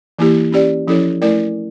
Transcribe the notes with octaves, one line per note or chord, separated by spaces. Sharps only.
E3 A#3 E4 G4
C#4 G4 D5
F3 C#4 E4 A4 C#5
A3 E4 A#4 D5